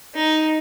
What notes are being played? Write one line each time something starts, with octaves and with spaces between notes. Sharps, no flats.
D#4